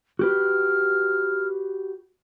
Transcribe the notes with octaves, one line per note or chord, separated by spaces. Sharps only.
F#4 G4 B4 F6